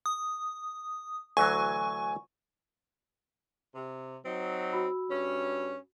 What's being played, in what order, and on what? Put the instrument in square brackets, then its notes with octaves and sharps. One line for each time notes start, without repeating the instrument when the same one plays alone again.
[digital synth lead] D#6
[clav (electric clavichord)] D2 E3 F#3 [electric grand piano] G#5 [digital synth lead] C#6
[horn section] C3
F#3 C4 D#4
[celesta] F#4 B5 E6
[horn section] G2 C#4